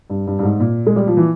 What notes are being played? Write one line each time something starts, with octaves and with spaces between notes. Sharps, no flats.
G2
G2
G2
G#2
A#2
G#3
G3
F3
E3